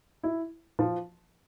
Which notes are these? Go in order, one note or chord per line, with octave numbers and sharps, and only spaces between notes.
E4
F3